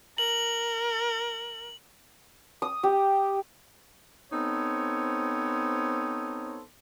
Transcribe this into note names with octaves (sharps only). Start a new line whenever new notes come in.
A#4 F#7
D#6
G4
B3 C4 D#4 A4 C5 C#5